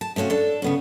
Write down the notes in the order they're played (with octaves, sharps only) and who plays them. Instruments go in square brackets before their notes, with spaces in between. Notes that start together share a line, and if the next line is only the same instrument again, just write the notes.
[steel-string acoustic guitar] A5
C3 A3 C#4 F#4 F5
D4 A4
C#3 B3 C#4